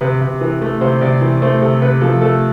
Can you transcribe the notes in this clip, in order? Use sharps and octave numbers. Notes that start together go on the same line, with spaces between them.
C3 B4
C3
E3
A3
C3 C5
C3 D5
E3
A3 C5
C3 A4
C3 B4
F3 A4
A3 A4